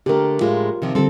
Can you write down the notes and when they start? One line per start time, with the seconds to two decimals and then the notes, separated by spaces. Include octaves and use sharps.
0.06 D3 A3 G4 A#4
0.41 A2 G#3 F4
0.82 C3 D#3 F3
0.95 D3 G3 C4 A4